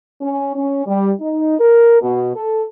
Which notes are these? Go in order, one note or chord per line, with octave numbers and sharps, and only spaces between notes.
C#4
C#4
G3
D#4
A#4
B2
A4